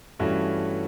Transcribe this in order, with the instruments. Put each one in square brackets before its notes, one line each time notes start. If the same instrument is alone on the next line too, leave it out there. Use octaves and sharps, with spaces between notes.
[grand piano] G2 E3 A3 C#4 F#4